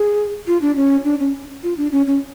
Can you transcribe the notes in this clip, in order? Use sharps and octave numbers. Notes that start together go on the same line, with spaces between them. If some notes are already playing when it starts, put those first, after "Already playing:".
Already playing: G#4
F4
D4
C#4
D4
C#4
F4
D4
C#4
C#4